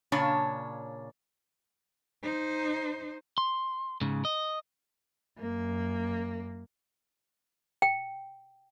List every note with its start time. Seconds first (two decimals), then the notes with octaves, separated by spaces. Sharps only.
0.12 A#2 C#3 D4 C#5 A5
2.23 D#4 C5
3.38 C6
4.01 G#2 C#3
4.25 D#5
5.39 F#2 A#3
7.82 G5